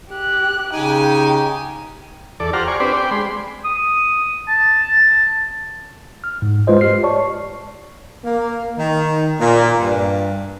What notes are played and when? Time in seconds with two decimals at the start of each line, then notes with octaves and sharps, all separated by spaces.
0.10 G4 F#6
0.74 C#3 D#4 G4 G5 G#5
2.40 E2 A4 D5
2.53 F4 G4 C5 F#5 A#5 F6
2.68 D5 G#5 C#6
2.80 C4 D4 G4 B4 C5 D5
2.96 D5 G5
3.11 G#3 B5 C6
3.65 D#6
4.48 A5
6.24 F6
6.42 G#2
6.67 G#3 F4 B4 C5 D#5
6.81 G4 F6 C7
7.03 C#5 D5 A5 C#6
8.25 A#3
8.78 D#3
9.40 A#2
9.81 G2